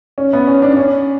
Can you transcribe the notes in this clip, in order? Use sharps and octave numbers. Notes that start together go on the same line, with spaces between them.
C#4
B3
C#4
D4
D4
C#4